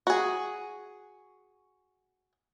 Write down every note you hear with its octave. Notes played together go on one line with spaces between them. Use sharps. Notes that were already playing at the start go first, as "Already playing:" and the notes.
F#4 G#4